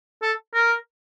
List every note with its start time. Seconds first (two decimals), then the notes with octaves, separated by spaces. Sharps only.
0.22 A4
0.54 A#4